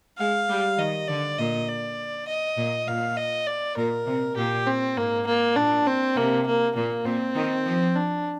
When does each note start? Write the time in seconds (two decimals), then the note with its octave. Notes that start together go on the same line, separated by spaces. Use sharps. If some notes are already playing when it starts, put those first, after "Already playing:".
0.18 G#3 F5
0.49 G3
0.78 D#3 D#5
1.08 D3 D5
1.38 A#2 D#5
1.68 D5
2.28 D#5
2.58 A#2
2.87 A#2 F5
3.17 D#5
3.47 D5
3.77 A#2 A#4
4.07 C3
4.37 A#2 G4
4.67 C4
4.97 G#2 A#3
5.27 A#3
5.56 A#2 D4
5.87 C4
6.17 C3 A#3
6.47 A#3
6.75 A#2 A#3
7.05 A#2 C4
7.36 D#3
7.65 F3
7.96 D4